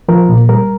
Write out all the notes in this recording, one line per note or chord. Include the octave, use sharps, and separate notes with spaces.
F3 A#4
A#2
G3 A#4